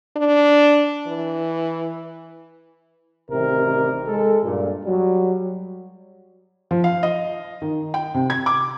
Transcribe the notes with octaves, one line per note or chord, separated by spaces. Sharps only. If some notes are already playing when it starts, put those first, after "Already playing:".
D4
E3
A1 C3 D#3 G3 A#4
G#3 A4
G2 A#2
F#3 G3
F3
F5
D#5
D#3
G5
C3
G#6
D6